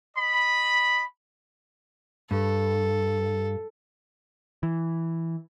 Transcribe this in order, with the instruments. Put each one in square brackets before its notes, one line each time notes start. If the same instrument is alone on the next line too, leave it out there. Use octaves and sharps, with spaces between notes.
[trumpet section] D#5 B5
[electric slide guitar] G2 [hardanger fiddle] A4
[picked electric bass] E3